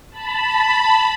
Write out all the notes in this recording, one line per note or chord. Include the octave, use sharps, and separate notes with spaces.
A5 B5